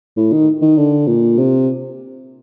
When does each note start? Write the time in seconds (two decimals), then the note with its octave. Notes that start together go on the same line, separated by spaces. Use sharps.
0.17 A2
0.32 D#3
0.62 D#3
0.77 D3
1.07 A#2
1.38 C3